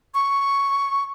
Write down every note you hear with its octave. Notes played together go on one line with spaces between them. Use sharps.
C#6